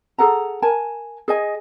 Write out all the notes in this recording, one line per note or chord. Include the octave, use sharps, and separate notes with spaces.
G#4 A4 F#5 A#5
A#4 G#5 A5
G#4 D#5 G#5